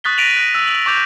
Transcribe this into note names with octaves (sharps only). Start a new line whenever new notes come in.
C#6 D#6 F#6 A6 B6 G7
A#6 B6 D7 D#7 F7 F#7
F#6 A#6
E6
F#7
C#6 D6 G6 F7